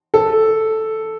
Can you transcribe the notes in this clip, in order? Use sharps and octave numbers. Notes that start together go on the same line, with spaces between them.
A4